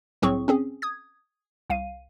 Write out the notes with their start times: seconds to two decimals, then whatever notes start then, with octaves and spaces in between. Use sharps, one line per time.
0.22 C2 A2 F#3 C4 G#4 C#6
0.48 C4 C#4 G#4
0.82 D#6 G#6
1.70 C2 F5 D#7